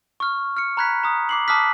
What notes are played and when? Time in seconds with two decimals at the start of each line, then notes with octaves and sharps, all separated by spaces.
0.20 C#6 F6
0.57 F6 C#7
0.77 A#5 B5 F#6 G#6 B6
1.03 A#5 D#6
1.29 D6 C7 F#7
1.48 A5 D6 D#6 F6 F#6 B6